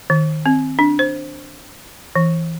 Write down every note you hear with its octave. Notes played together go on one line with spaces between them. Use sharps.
D#3
C4
D4
C5
E3